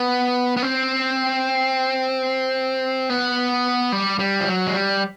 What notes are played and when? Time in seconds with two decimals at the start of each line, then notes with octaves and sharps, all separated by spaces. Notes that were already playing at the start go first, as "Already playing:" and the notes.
Already playing: B3
0.57 B3
0.63 C4
3.10 B3
3.92 G3
4.19 G3
4.41 F3
4.47 F#3
4.67 G#3
4.74 G3